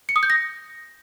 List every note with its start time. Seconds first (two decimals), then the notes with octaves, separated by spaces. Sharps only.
0.09 C#7
0.16 D#6
0.23 G6
0.30 A#6